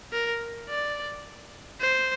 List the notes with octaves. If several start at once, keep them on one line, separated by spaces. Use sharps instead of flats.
A#4
D5
C5